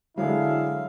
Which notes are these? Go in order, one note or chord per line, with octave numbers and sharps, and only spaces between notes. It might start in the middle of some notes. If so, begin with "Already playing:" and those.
D3 F#3 G#3 E4 F5